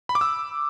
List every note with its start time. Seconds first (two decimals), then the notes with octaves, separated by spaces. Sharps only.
0.09 B5
0.15 D6
0.21 E6